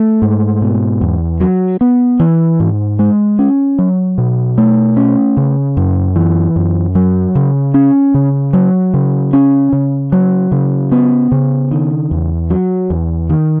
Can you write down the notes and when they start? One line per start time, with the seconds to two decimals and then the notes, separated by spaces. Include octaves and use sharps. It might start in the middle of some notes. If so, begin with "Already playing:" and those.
Already playing: A3
0.22 G#2
0.62 B2
1.01 E2
1.40 F#3
1.81 B3
2.20 E3
2.60 G#2
2.99 G#3
3.39 C#4
3.79 F#3
4.18 B2
4.58 A3
4.97 C#4
5.37 C#3
5.77 F#2
6.16 E3
6.56 F#2
6.95 F#3
7.35 C#3
7.74 C#4
8.14 C#3
8.53 F#3
8.94 C#3
9.33 C#4
9.73 C#3
10.12 F#3
10.52 C#3
10.92 B3
11.32 C#3
11.71 D#3
12.11 E2
12.50 F#3
12.90 E2
13.29 D#3